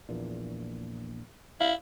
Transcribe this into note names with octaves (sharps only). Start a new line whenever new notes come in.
A#1 E2 A#2
E4 F5